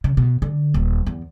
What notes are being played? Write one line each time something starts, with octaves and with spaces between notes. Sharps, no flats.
C#3
B2
D3
D#1
E2